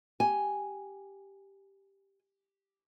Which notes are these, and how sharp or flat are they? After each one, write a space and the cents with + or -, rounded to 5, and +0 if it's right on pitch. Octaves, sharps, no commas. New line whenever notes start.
G4 +0 G#5 +0